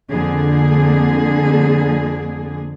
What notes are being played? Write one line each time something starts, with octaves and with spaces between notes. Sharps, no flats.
F2 D3 A#3 G#4